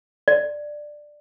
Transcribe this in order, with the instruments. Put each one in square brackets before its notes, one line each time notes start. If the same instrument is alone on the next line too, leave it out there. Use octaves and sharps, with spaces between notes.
[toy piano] D5